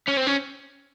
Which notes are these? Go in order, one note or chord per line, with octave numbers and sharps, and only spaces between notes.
C#4
C4
C#4